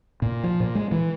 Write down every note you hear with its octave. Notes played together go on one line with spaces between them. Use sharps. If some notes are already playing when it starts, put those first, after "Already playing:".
A#2
F3
A#2
G#3
E3